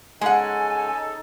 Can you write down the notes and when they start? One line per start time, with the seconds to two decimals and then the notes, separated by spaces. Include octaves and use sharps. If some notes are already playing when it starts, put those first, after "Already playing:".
0.21 C#3 G#3 D#4 A4 F#5 G#5